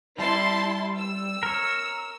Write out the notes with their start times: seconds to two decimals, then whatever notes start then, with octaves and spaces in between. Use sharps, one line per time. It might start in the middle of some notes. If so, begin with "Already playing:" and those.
0.18 G3 E4 A5 C6
0.97 E6
1.43 A#4 C#5